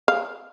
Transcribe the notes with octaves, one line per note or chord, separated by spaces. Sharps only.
F5